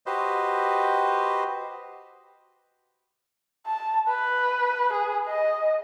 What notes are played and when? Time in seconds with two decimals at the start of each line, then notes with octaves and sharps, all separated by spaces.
0.06 F#4 G4 B4 C5 D#5
3.66 A5
4.08 B4
4.92 G#4
5.28 D#5